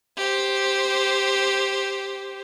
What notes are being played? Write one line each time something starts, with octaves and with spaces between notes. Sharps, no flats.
G4 C5